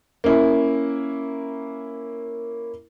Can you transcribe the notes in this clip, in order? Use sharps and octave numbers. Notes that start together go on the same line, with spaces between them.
A#3 C#4 E4